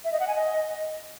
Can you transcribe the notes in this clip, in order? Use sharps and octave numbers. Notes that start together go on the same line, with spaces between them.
E5
D#5
F#5
G#5
D#5